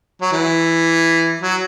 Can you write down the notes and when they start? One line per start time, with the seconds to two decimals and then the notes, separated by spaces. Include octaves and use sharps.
0.21 F#3
0.32 E3
1.42 F#3